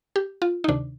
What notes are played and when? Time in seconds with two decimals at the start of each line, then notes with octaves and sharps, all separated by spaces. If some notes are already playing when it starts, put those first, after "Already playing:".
0.16 G4
0.42 F4
0.64 D#4
0.68 D2 C3 D#3 D4